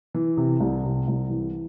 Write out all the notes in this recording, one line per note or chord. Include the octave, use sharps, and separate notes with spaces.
E3
C3
C2
C3
C2
E3